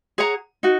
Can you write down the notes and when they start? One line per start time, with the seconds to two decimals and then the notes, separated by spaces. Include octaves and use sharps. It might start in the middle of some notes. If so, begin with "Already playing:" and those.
0.18 G#4 C#5 F#5 A#5
0.63 D#4 F#4